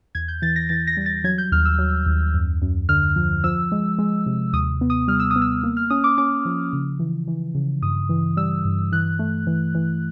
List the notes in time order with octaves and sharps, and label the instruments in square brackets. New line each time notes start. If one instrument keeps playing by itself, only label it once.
[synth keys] E2 G#6
G6
E3 A6
A#6
E3 A6
A#6
G3
A6
F#3 G#6
G6
D#2 F6
E6
F#3
D#2
F#2
F#2
D3 F6
F3
F3 E6
G#3
G#3
C3
D#2 D#6
B3
D#6
G3 F6
E6
D#6
B3
E6
A#3
F6
C#4 D#6
D6
C#4 D6
F3
C#3
E3
E3
C#3
G2 D#6
E3
G3 E6
G2
E3 F#6
A3
E3
E3